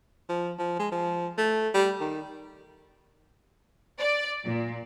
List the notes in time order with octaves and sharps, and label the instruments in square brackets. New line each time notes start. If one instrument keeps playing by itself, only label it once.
[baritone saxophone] F3
F3
G#3
F3
A3
G3
D#3
[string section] D5
A#2